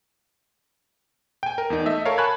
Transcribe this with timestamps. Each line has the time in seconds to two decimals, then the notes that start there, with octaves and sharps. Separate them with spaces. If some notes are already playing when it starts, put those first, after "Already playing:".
1.43 G5 G#5
1.58 A#4
1.70 E2 D#4
1.86 A3 D#5 E5
2.05 A4 A#4 C#5 F5
2.18 G#5 A5 B5 C#6 F#6 G#6